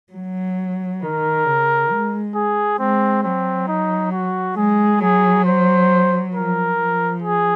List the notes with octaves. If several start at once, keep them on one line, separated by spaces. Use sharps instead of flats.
F#3
D#3 A#4
C#3
G#3
G#4
G#3 C4
F#3 C4
D#4
F#4
G#3 G#4
F#3 G#4
C5
F3 A#4
F3
G#4